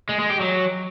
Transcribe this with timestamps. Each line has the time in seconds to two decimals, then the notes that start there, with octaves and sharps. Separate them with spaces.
0.09 G#3
0.19 G#3
0.30 G4
0.40 F#3